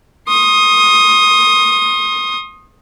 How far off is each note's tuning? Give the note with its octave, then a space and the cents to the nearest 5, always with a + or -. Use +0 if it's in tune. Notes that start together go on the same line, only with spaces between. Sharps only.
C6 +40 D#6 +0